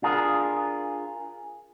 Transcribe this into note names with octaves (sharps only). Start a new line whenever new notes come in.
D4 F4 G#4 A#4